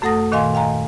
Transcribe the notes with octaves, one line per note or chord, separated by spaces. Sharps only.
F#2 A3 A4 F#5 D#6 A#6
A#2 D#3 D#5 F5 G#5 C6
D#2 F5 G#5 A#5